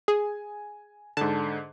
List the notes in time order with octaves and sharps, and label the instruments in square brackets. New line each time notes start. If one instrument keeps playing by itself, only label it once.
[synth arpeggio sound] G#4 [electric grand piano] G#5
[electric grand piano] G#2 D3 [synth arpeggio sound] A5